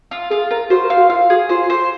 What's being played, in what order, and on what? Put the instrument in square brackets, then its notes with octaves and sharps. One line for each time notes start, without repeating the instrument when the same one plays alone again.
[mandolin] F4
[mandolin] F4 [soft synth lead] G#4
[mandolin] F4 [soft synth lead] A#4
[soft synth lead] F#4 [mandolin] C5
[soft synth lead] A#4
[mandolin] F5
[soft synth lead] F#4
[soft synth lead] F4 [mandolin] F5
[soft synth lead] F#4 [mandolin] G#4
[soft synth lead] F4 [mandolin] C5
[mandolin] C5